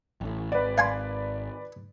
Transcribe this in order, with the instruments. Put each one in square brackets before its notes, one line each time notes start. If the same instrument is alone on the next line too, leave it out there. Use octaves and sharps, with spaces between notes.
[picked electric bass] A1 A2
[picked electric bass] G#1 [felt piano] B4 D5
[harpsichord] F5 G#5 C6